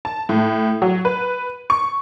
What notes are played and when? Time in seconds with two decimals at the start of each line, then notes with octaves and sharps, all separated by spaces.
0.05 A5
0.29 A2
0.82 F#3
1.05 B4
1.70 C#6